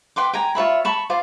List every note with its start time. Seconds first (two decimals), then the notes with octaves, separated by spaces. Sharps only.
0.16 B4 G5 C6 D6
0.33 G5 G#5 A#5
0.55 F4 C#5 E5 B5
0.85 A5 B5 C#6
1.10 F4 C5 D5